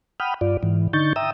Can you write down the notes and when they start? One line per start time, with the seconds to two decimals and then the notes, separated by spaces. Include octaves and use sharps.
0.20 F#5 G5 B5 D#6 F6
0.41 G2 F4 D5
0.63 G#2 E3
0.93 D3 D#4 C#6 G6 A6
1.16 E5 G5 A#5 D#6 E6